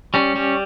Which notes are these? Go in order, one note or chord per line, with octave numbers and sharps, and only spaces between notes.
G3 C#4
G3